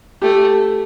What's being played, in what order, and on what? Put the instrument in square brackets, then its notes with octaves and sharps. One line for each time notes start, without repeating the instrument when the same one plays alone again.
[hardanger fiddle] A3 [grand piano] G4